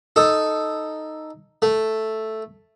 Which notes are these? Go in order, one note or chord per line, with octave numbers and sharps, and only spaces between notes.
D#4 A4
A3